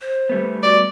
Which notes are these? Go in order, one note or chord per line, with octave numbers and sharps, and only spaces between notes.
C5
G3 A3 B3
F#4 D5